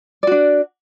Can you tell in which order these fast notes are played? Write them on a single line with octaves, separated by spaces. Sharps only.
D5 F#4 D4